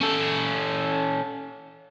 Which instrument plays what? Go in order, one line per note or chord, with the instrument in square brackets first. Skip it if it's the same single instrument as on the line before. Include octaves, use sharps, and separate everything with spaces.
[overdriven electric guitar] C#4 A4